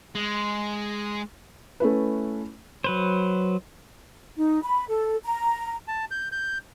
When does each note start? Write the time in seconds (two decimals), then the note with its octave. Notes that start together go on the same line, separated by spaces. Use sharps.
0.15 G#3
1.80 A3 C#4 E4 B4
2.84 F#3 B4 C5
4.37 D#4
4.63 B5
4.88 A4
5.25 A#5
5.88 A5
6.11 G6
6.32 G6